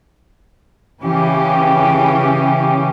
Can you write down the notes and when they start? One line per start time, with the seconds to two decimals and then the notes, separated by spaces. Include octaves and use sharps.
1.03 C#3 E3 C#4 G4